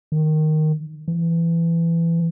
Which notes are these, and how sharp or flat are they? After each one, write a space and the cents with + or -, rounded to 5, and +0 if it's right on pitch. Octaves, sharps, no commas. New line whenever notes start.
D#3 -5
E3 +20